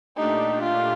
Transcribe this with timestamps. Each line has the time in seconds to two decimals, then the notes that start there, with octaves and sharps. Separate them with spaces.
0.16 A#2 A3 D4 D#4 G4
0.62 F4